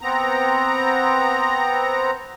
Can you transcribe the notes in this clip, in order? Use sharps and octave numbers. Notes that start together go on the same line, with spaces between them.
B3 C4 A#5